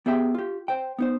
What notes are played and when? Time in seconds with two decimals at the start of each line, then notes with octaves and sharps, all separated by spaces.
0.06 B3 G4 G#4 E5 G5
0.35 F4 G4
0.68 C5 G5
0.98 B3 D#4 C5